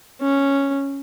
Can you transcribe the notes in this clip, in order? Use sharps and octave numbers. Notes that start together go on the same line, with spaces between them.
C#4